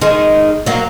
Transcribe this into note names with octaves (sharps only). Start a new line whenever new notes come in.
D#3 G#3
F#3 A#3